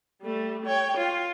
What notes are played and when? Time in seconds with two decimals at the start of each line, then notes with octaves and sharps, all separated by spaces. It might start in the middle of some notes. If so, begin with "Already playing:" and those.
0.22 G3 A3
0.66 C#5 G5
0.97 F4